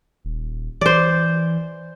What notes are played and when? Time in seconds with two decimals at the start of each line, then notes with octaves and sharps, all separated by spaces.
0.25 D#1
0.81 E3 C5 D5